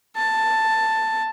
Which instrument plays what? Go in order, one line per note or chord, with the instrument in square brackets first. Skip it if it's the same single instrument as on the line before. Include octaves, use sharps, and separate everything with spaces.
[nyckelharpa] A5